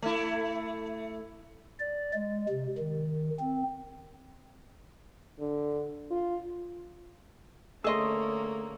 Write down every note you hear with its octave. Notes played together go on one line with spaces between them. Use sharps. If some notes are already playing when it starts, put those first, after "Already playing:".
A3 E4
D5
G#3
C3
D#3
C4
D3
F4
D3 A3 A#3 C#4 G#4 D#5 C6 E6